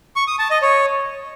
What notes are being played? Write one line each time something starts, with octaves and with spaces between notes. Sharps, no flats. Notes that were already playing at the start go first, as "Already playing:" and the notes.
C#6
D#6
A5
D#5
C#5